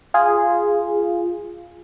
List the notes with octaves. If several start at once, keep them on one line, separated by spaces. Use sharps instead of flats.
F4 G#4